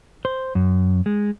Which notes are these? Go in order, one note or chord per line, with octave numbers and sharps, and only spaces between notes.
C5
F#2
G#3